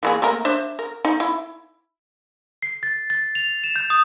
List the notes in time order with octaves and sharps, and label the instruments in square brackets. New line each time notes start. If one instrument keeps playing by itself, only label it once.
[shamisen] E3 A#3 G#4
A3 A#3 A#4
D4 C5 E5
A#4
D#4
E4
[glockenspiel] C7
A6
A6
F7
E7
G6
D#6